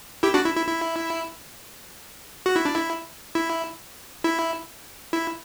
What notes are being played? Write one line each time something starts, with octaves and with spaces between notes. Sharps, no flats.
E4 G4
D4 F#4
E4
E4
E4
F#4
E4
D4
E4
E4
E4
E4